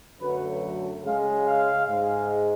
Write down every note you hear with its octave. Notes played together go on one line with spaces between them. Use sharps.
F#2 D3 F#3 A3 B4
C#3 G#3 F5
F5
G#2 G#3